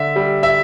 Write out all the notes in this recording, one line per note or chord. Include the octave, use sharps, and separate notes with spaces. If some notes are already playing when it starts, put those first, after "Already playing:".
Already playing: D3 E5
G3
E5